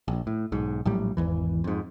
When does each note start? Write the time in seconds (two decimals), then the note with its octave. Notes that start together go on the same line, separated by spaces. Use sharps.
0.08 A#1
0.27 A2
0.52 B1 G#2
0.85 A#1 A2 F#3 G3
1.17 G#1 E2 E3
1.64 F2 G#2